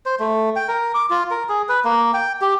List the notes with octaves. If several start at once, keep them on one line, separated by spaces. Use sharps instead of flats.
C5
A3
G5
A#4
D6
F4
A#4
G#4
B4
A#3
G5
G4